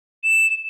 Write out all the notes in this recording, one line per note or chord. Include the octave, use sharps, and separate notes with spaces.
E7